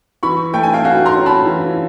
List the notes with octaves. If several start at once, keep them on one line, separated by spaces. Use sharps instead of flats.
E3 B5 C#6
A3 G5
G#5
F5 G5
F#4 F5 G5
A#5 C6
C#4
A5 B5
E3